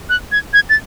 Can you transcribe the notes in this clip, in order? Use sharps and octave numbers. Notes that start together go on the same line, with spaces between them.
F#6
G#6
G#6
A6